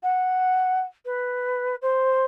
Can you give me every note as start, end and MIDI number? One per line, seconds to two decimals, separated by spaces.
0.02 0.80 78
1.05 1.75 71
1.81 2.25 72